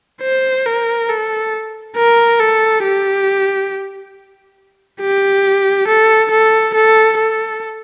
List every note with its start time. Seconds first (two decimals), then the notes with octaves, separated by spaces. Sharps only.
0.22 C5
0.66 A#4
1.09 A4
1.96 A#4
2.40 A4
2.83 G4
5.01 G4
5.87 A4
6.31 A4
6.74 A4
7.18 A4